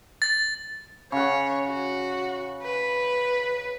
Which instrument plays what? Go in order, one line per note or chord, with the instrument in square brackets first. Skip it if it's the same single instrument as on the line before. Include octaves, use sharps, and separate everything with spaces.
[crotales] A6
[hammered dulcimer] C#3 F#5 [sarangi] C#5
[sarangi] F#4
B4